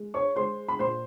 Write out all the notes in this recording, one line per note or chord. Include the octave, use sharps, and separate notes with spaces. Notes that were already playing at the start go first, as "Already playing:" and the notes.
Already playing: G#3
C#5 C#6
G#3 C5 C6
B5
A#2 C5 C6